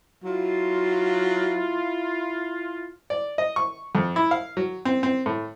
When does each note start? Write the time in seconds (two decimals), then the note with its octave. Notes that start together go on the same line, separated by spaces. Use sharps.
0.24 F#3 E4 F4
3.10 D5
3.38 D#5
3.56 C#6
3.95 F2
4.16 E4
4.31 F5
4.57 F#3
4.85 C4
5.03 C4
5.26 A2